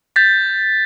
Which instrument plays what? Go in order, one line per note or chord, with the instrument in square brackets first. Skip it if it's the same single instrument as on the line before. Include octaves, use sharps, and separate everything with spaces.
[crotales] G6 A6 B6